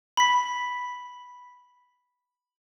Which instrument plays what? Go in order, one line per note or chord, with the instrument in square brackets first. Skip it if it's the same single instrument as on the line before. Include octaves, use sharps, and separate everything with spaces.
[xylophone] B5 B6